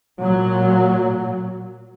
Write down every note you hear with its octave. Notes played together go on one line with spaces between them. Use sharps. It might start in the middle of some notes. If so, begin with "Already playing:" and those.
A#2 F#3